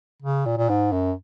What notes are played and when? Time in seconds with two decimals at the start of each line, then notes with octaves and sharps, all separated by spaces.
0.22 C#3
0.46 A#2
0.57 A#2
0.69 G#2
0.92 F#2